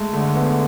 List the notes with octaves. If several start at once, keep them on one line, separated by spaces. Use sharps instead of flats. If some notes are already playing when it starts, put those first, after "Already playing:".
Already playing: G#3 A3
D3 A3
B3